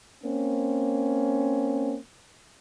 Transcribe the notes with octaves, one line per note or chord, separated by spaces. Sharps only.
A#3 C4 C#4